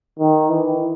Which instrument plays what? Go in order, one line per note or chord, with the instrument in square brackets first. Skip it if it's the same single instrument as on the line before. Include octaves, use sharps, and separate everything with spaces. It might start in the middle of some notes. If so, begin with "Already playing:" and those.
[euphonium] D#3
E3